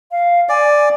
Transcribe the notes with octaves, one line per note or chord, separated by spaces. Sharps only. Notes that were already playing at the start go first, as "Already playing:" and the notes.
F5
D5 G#5